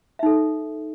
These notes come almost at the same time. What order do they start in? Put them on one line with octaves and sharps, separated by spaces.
E5 D#4 A4